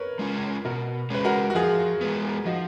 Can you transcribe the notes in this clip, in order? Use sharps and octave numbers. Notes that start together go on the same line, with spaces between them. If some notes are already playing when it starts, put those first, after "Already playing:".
Already playing: A#4 B4 C#5
G#3 C#4 F4
B2 F#4 A#4
G#3 C#4 B4
F#4 A#4
F#4
F3 F4 G#4
G#3 B3
F3 D#4 F#4